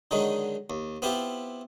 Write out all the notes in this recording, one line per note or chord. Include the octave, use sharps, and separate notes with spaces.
D3 D#3 F#3 G#3 D#4
D#2
B3 C4 E4 F4 G4